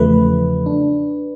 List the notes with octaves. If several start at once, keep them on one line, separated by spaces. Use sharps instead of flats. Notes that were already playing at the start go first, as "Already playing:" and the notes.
Already playing: E2 C#3 F3 A3 B4
D4